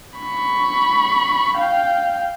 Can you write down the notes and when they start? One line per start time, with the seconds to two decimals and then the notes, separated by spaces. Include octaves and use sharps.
0.19 B5 C#6
1.57 F5 G5